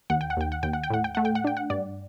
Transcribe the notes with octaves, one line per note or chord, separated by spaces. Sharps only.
D#2 F#5
G5
F#5
D#2 G5
F#5
D#2 G5
F#5
G5
A2 F#5
G5
A3 F#5
G5
F#5
D4 G5
F#5
G2 D5